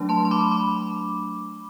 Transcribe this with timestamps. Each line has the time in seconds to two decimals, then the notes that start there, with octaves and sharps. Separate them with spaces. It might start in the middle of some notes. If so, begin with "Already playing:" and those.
Already playing: F#3 A3 D4
0.09 A5 C6
0.25 C6
0.31 B5 D6
0.51 B5 D6